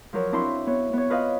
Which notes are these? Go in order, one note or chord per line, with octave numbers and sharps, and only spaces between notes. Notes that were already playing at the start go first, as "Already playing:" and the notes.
F3 F#3 A#4 C#5
C4 D4 E4 F#4 B5 C6
B3 C#5
B3 C#5
F4 B4 D#5 F5